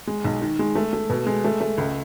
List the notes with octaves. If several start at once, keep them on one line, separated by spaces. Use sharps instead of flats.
G#3
B1
D#3
G#3
A3
A3
B2
G#3
A3
A3
C#2